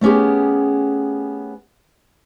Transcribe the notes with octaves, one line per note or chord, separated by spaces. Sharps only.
A3 B3 C#4 G4 G#4